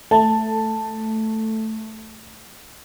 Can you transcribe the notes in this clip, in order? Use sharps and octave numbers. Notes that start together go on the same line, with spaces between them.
A3 A5